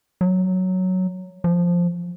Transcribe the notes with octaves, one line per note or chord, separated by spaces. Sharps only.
F#3
F3